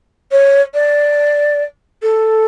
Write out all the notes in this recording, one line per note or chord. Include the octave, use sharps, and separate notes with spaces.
C#5
D5
A4